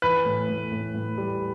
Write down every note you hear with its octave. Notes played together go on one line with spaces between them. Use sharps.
E3 B4
A2
A2
A2
A2
G3